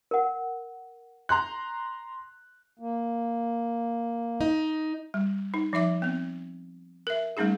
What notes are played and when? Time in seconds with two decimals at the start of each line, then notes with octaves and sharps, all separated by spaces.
0.11 A#4 F#5
1.29 A#5 C6 F#6
2.79 A#3
4.41 D#4
5.14 G3
5.54 D#4
5.73 F3 D#4 E5 D6
6.02 B3 C4
7.07 A#4 E5
7.37 G3 A3 C#4 D#4 G#4